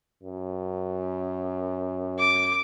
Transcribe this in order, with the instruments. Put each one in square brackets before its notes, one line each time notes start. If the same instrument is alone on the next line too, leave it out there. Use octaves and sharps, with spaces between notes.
[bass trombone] F#2
[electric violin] D6